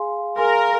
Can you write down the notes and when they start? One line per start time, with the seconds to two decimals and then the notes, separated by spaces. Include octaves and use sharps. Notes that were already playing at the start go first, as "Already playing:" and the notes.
Already playing: G#4 F5 G#5 C6
0.38 G#4 A#4 F5 G#5 C6